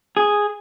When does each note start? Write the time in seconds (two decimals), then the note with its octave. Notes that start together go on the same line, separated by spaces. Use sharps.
0.17 G#4